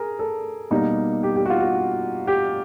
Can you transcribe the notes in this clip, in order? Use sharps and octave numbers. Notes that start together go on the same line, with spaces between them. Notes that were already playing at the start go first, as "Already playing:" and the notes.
Already playing: G#4 A#4
A4
B2 G3 A#3 D#4
G4
G4
F#4
F4
F#4
G4